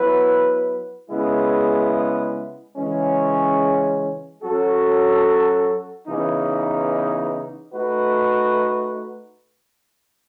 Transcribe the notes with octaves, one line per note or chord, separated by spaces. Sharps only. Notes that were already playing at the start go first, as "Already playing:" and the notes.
Already playing: F#3 B3 E4 B4
C#3 G#3 B3 E4
C#3 E3 G#3 C#4
F#3 C#4 F#4 A4
C#3 E3 B3 D#4
A3 D#4 F#4 B4